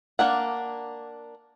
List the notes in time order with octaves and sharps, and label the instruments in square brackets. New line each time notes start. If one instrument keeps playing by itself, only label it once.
[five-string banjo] A#3 D4 F#5